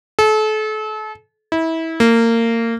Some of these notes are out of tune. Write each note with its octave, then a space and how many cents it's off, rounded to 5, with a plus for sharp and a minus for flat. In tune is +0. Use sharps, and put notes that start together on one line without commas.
A4 -35
E4 -25
A#3 -25